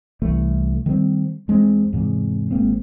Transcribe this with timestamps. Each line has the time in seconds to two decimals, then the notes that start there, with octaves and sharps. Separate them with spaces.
0.22 C2 E3 A3
0.86 D#3 G3 G#3 C4
1.48 E2 G#3 A#3 C4
1.93 E2 G#2 C3
2.51 G#1 G#3 A#3 C4